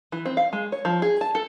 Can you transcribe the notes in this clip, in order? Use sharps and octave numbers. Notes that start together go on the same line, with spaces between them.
E3
C4
F5
G#3
C#5
F3
G#4
A5
A4